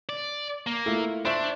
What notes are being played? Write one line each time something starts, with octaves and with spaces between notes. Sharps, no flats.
D5
A#3
A3 E4 F4
D4 C5 E5 C#6